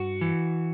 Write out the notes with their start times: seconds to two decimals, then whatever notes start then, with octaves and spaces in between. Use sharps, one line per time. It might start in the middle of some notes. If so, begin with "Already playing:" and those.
Already playing: G2 F#4
0.21 E3